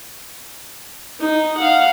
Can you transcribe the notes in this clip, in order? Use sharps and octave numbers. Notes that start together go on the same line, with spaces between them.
D#4
F5 F#5